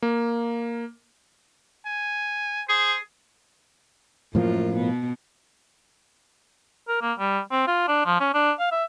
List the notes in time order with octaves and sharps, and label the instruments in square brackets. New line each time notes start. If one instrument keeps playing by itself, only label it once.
[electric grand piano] A#3
[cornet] G#5
[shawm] G#4 [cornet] C5
[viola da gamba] F#2 F4 [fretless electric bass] A2 F3 A#3
[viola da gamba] B2 B3
[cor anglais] A#4
A#3
G3
C4
F4
D4
F3
C#4
D4
F5
E5